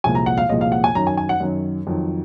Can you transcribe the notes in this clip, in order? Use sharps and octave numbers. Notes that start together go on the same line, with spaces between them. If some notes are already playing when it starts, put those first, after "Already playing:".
C2 A#2 F3 G#3 G#5
A#5
F#5
F5
C2 A#2 F3 G#3 D#5
F5
F#5
G#5
F#2 D#3 F#3 A#5
G#5
G#5
F#5
F#2 D#3 F#3
F2 D#3 F#3